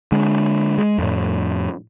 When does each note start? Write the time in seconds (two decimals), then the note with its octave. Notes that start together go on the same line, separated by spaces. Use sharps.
0.12 D3 G#3
0.78 G#3
0.98 F2 A2